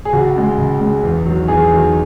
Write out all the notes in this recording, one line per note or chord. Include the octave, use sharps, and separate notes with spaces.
G#4
C#2 F#4
C#3 G#3
C#2
C#3 G#3
E2
D#3 F#3
E2 G#4
D#3 F#3